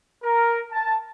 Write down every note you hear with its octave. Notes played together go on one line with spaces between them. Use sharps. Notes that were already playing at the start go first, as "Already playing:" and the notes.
A#4
A5